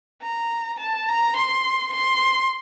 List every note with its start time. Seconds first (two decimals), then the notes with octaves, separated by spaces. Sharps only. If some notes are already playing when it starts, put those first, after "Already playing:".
0.23 A#5
0.80 A5
1.09 A#5
1.37 C6
1.94 C6